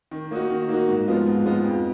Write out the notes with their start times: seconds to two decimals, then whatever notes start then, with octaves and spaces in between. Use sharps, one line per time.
0.11 D#3
0.31 A#3 D#4 F#4
0.50 D#3
0.69 A#3 D#4 F#4
0.89 G#2
1.07 F3 G#3 B3 F4
1.26 G#2
1.45 F3 G#3 B3 F4
1.64 F2